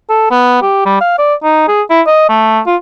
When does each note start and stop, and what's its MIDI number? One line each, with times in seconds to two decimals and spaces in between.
0.10 0.30 69
0.31 0.60 59
0.62 0.84 67
0.86 0.96 55
1.01 1.17 77
1.19 1.35 74
1.44 1.68 63
1.68 1.82 68
1.90 2.02 64
2.07 2.28 75
2.29 2.60 57
2.67 2.76 65